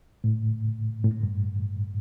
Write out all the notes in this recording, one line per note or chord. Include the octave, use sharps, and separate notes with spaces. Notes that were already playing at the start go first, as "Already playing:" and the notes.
A2
A2
G2